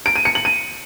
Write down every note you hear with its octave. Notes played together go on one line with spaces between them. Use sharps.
D7
D#7
C#7
F#7
D#7